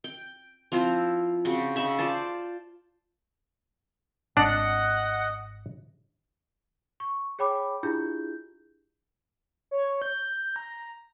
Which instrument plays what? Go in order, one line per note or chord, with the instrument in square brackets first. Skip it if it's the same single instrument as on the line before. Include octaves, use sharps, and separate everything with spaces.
[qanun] G5
F3 C4 E4 F4
C#3 C4 F#4 G5
C#3 D#4 E5 B5
F4 C5 D5 A5
[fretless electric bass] G#1 [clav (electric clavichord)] D4 [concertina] D#5 [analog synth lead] F#5
[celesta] C#6
G#4 C#5 G5 B5 D6
D4 E4 F4 G4 G#4 G6
[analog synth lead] C#5
G6
A#5